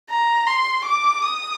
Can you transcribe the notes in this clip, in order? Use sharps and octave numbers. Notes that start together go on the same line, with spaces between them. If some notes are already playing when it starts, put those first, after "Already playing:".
A#5
C6
D6
D#6